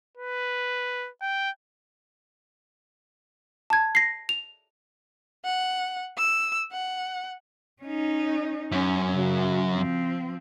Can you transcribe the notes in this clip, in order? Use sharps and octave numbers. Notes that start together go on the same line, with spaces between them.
B4
G5
A5 G#6
A#6 C7
F7
F#5
E6
F#5
C#4 D#4
F#2 C#4
C#3 F#4
F3 C4